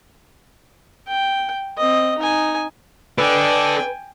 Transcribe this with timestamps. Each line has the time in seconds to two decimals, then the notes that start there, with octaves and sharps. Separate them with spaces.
1.08 G5
1.77 C4 D#5
2.18 D#4 G#5
3.18 D4 A4 B4 D5 D#5 G5 G#5